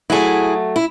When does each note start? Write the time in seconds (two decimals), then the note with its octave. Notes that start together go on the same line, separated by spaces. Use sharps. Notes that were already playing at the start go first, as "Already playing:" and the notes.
0.10 F#3 A3 E4 G#4
0.76 E4